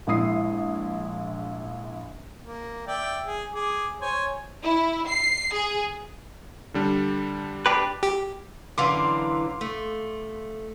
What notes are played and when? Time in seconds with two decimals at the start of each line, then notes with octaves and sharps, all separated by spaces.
0.07 A#1 G#3 E4 D#6 C7
2.43 A#3
2.87 D5 E5 G5
3.25 G#4
3.55 G#4 D6
4.01 C5 C#5 G#5
4.64 E4
5.07 C7
5.53 G#4
6.74 D3 G3 D4
7.66 D4 G4 B4
8.03 G4
8.78 F#2 D3 E3 F5 C6 D6
9.61 A3